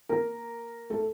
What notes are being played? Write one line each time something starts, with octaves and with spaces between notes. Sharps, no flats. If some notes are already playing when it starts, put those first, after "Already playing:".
A#3 A#4
A3 A4